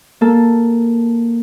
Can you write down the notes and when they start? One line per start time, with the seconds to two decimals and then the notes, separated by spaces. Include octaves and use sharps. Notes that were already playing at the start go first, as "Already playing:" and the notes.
0.21 A#3 A4